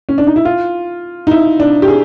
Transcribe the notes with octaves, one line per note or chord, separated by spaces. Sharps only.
C#4
D4
D#4
E4
F4
D#4
E4
D4
G4
G#4